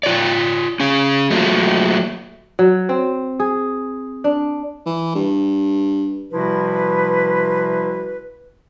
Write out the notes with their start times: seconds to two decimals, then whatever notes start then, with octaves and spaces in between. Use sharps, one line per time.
0.03 F4 C#5 D5
0.80 C#4 G#4
1.30 F#3 A3 A#3 F4
2.59 F#3
2.89 C4
3.40 G#4
4.24 D4
4.86 E3
5.15 G2
6.31 C3 F3 G3 E4 F#4 B4